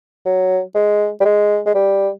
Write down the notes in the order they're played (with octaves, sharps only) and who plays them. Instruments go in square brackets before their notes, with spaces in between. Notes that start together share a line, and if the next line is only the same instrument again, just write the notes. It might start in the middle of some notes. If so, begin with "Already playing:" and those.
[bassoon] F#3
G#3
G3
G#3
G#3
G3